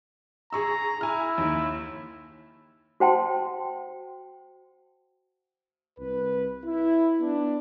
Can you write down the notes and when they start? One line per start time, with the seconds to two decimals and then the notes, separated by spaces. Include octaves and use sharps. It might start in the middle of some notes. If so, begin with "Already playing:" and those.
0.53 G#4 A#5 C#6 E6
1.01 E4 G#5 F6
1.38 D#2 D#3
3.00 F#4 C5 F#5 G5 A5 C6
5.99 C2 B4
6.64 E4
7.20 B3 D4